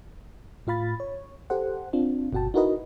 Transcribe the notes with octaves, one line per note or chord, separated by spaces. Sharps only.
A2 F4 F5 B5 A6
C#5
G4 A4 C5 F#5
C4 D4 F4
G1 B2 F#4 G5 A5
D#4 E4 F#4 A#4 B4 D#5